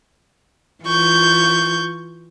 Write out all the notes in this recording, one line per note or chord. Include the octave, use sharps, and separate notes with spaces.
E3 F4 C#6 G6